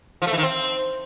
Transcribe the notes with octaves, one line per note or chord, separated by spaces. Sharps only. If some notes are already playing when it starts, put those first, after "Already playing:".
F3
A3
E3
D#3
C4